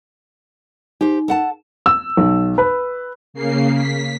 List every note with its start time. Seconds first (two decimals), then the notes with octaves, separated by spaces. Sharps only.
1.01 D#4 G4 C5
1.28 A4 F#5 A5
1.86 E6
2.17 B1
2.58 B4
3.34 C#3 A#3 C7
3.74 B6